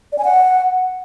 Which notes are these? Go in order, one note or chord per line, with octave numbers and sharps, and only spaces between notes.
D5
G#5
F#5